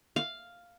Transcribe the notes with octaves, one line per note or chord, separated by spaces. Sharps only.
F5